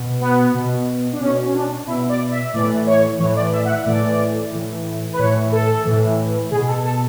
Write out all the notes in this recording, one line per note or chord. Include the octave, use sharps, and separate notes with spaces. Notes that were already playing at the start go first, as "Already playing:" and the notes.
Already playing: B2
B3
B2
D4
B2 C#4
C#4
D4
B2 E4
D5
E5
A2 E3 D5
C#5
A2 E3 C#5
D5
E5
F#5
E5
A2 E3 D5
A2 E3
B4
A2 E3 C#5
A4
A2 E3
B2 G#4
A4
A4